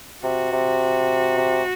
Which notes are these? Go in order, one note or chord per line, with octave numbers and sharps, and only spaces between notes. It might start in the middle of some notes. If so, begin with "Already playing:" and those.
C3 F#4
C3
C3